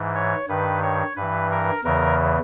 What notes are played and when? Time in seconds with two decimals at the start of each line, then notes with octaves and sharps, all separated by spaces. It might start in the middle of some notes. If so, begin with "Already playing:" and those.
Already playing: G#2 E3
0.15 C#5
0.48 G2 D#3 B4
0.83 C#5
1.16 G2 E3 B4
1.51 A#4
1.84 E2 C#3 E3 A#4